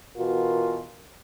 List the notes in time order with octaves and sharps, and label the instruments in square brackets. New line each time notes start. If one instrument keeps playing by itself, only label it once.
[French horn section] B2 E3 F4 F#4 A#4